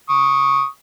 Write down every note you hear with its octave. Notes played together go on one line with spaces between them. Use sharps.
C#6 D#6